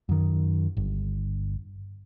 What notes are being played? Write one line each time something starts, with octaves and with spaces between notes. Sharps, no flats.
F#2 D#3
G1